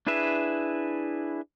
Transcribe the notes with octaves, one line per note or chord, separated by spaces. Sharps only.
D4 E4 G#4 B4 E5